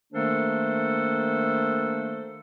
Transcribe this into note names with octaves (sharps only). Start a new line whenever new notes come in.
D#3 A3 A#3 D4 A4 C5